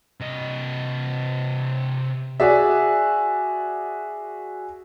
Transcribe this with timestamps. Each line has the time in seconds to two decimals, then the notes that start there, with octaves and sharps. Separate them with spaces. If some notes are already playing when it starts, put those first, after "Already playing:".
0.20 C3 D#5
2.40 F#4 G#4 D5 E5